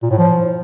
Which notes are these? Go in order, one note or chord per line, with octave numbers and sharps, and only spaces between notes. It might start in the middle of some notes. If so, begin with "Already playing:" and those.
A#2
A2
F3